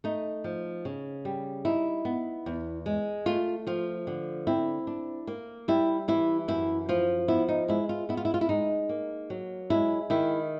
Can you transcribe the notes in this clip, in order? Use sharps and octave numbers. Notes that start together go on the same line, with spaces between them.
A3 D#4
F3
C#3
G3
D#4 E4
B3
E2
G#3
A3 F4
F3 F4
D3
C4 E4
D4
A#3
G3 E4
E3 E4
F#2 E4
F3 F4
B3 E4
D#4
G#3 E4
F4
B3 E4
F4
E4
F4
E4
G#3 D#4
A#3
F#3
G#3 E4
D#3 E4